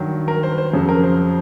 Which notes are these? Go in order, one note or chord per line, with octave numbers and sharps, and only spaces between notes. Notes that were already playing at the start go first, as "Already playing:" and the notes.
Already playing: G2 D#3 F#3
A#4
C5
B4
C5
F2 C#3 F#3
A#4
C5